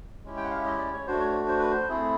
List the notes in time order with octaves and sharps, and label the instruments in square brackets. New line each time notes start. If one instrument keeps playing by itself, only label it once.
[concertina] G#3 C#4 E4 G4
G5
F#5
F5
E5
D#5
D5
C#5
A3 D4 F#4 C5
C#5
C5
B4
C5
A3 C4 E4 G#4